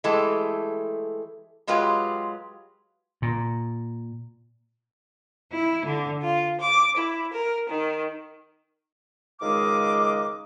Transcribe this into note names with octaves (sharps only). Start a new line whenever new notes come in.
E3 G#3 A3 G4 A4
F#3 G#3 F4 G4 B4
A#2
E4
D3
F4
D6
E4
A#4
D#3
C#2 D#3 G#3 D#5 F5 D6